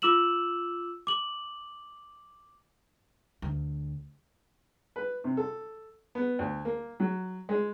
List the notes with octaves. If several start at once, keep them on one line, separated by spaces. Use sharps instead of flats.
F4 D6 E6 E7 F#7
D6 F#7
D2
B4
C3
A4
B3
D2
A#3
F#3
G#3